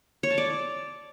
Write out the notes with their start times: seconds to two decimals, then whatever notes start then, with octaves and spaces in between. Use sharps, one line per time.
0.23 C#5
0.30 A5
0.38 D5